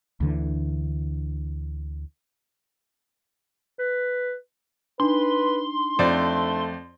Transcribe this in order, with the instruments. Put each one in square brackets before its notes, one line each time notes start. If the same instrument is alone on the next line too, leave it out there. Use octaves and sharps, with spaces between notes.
[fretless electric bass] D2 D3 E3
[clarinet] B4
[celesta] D4 D#4 [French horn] B4 [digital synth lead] C6
[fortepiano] F2 C5 D5 [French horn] A3